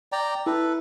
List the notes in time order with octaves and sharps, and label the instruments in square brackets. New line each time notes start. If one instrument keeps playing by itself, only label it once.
[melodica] D5 G5 A#5
[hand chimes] E4 [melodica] A4 B4